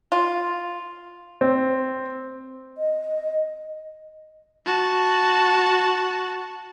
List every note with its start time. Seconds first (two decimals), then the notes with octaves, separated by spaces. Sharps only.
0.12 F4
1.41 C4
2.78 D#5
4.66 F#4 A5